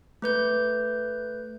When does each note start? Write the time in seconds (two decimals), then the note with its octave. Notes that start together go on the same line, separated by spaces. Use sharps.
0.22 A3 B4 G6